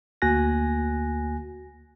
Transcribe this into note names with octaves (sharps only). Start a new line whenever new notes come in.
D2 A#3 F#4 G#5 F#6 A#6